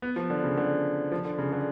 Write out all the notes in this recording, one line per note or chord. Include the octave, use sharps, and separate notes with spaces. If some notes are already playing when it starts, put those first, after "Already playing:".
B3
F3
D3
C#3
D3
F3
D3
C#3
D3